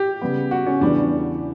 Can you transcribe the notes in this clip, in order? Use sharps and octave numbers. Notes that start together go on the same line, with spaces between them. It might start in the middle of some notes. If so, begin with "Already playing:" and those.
Already playing: G4
C#3 G3 B3
F#4
C#4
E2 C#3 E3 G3 B3 D4